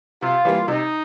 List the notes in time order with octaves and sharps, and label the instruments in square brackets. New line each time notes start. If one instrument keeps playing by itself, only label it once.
[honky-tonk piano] C3 [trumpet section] F4
[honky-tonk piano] E3 G3 A#3
[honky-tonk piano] C3 [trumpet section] D#4